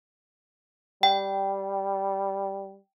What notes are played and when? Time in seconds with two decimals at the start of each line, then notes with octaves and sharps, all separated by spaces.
1.03 G3 G5